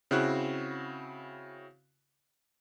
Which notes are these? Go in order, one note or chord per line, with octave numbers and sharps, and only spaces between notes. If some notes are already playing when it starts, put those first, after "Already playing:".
C#3 C4 E4 F#4 F#6